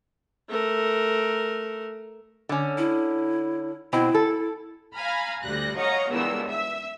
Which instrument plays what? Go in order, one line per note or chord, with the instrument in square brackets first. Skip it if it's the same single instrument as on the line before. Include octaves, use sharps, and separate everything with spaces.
[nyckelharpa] A3 A#4
[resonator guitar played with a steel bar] D3 C#4
[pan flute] E4
[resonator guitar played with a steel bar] B2 C4 [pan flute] E4
[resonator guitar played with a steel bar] A4
[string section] F5 G#5 A#5 B5 F6
D2 G3 F#6 A#6
C#5 D#5 F5 F#5 A#5 C#6
C#2 G2 E3 B3 A#4 E6
E5 E6